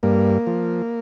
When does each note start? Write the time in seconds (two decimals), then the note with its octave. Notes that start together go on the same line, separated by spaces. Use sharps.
0.03 G2 A#3
0.47 F3